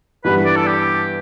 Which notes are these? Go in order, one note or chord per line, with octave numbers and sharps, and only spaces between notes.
G2 E3 G3 B3 B4
D5
A4
G4